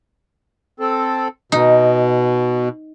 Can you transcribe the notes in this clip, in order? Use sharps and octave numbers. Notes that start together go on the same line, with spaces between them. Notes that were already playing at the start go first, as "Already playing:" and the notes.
C4 A4
B2 D#4